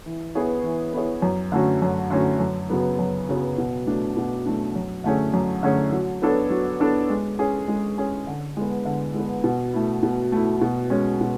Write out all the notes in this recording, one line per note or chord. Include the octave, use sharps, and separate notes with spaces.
E3
B3 E4 G#4 C#5
E3
B3 E4 G#4 C#5
F#2
D3 A3 C#4 F#4
F#2
D3 A3 C#4 F#4
F#2
C#3 F#3 B3
F#2
C#3 F#3 B3
B2
F#3 A3 D4
B2
F#3 A3 D4
F#2
D3 A3 C#4 G#4
F#2
D3 A3 C#4 G#4
F#3
B3 D4 A4 C#5
F#3
B3 D4 A4 C#5
G#3
C#4 G#4
G#3
C#4 G#4
D3
G#3 B3
D3
G#3 B3
B2
A3 E4
B2
A3 E4
B2
G#3 C#4
B2